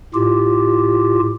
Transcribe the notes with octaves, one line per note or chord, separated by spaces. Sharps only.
A2 F4 G4